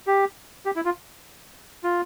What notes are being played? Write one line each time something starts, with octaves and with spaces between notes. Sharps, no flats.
G4
G4
E4
F4
F4